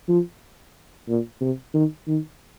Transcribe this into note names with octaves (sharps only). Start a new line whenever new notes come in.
F3
A#2
C3
D#3
D#3